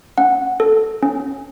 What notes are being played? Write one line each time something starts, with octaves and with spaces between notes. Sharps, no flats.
C#4 F#5
A4
C#4